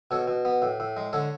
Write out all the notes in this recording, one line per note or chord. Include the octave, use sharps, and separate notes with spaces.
B2 A4 C#5
B2
B3
A2
A2
G#3
D3 A4 C#5